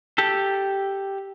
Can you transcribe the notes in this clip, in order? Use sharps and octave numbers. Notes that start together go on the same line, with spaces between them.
G4 A4